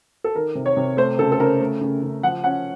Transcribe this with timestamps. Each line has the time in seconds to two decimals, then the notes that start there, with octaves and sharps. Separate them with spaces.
0.24 A4
0.35 D#3 A#4
0.55 C3
0.66 C#5
0.77 C3
0.97 A3 C5
1.19 C#3 A4
1.32 A4
1.40 C#3 A#4
1.60 A3
1.81 C#3
2.02 C#3
2.23 F3 F#5
2.44 C#4 F#5